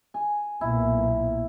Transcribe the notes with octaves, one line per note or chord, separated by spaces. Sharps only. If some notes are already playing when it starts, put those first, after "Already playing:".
G#5
B1 A#2 A#3 E4